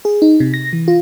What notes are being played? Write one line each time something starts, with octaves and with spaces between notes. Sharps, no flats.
G#4
D#4
C3
A#6
E3
F4